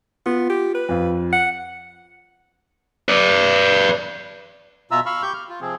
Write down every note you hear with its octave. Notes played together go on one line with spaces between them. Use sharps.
B3 F4
G4
B4
F2 F5
F#5
B4 D5
B2 F4 E5 A#5 E6
F5 B5 C#6 E6 F6
G4 C#6 G6
F6
F4
C3 F3 C4 G#4